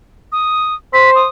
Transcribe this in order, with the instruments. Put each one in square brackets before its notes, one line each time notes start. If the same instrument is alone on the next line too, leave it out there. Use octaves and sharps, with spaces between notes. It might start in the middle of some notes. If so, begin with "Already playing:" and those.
[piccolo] D#6
[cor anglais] C5 [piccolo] B6
[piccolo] D#6